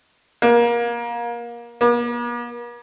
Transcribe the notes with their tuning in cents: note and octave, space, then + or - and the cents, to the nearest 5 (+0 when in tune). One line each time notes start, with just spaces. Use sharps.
A#3 +25
A#3 +45